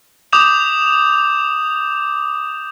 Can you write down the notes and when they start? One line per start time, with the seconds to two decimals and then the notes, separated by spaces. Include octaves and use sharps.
0.33 D6 D#6 G6 E7 F7